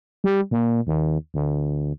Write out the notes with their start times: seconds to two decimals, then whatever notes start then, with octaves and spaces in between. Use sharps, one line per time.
0.24 G3
0.51 A#2
0.87 D#2
1.34 D2